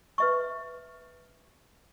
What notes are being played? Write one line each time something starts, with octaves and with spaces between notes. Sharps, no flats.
B4 E5 C#6